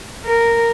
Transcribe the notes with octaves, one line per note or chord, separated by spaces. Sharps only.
A#4